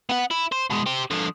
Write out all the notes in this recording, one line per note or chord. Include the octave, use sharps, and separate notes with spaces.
B3 F#5
E4
C5
B2 G#3
G4 C5
D3 F3